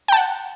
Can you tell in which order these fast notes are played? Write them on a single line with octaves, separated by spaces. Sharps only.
G5 A5 F#5